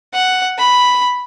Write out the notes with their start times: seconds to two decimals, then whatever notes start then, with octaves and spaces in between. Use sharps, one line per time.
0.13 F#5
0.58 B5